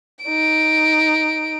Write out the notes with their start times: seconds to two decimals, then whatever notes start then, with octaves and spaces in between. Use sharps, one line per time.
0.25 D#4 D7